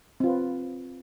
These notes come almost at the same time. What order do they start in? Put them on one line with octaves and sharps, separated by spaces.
C4 F4 B4